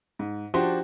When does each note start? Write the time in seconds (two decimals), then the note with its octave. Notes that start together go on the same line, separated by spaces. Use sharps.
0.19 G#2
0.54 F3 D4 F#4 G4 C5